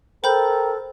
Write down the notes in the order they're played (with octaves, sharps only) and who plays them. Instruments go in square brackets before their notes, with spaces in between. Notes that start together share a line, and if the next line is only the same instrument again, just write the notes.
[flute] A4 [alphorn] A#4 [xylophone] C5 B5 G6 [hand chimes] G5